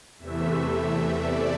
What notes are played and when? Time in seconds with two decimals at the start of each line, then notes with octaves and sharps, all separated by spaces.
0.18 E2 C3 E3 A3 E5
1.21 D5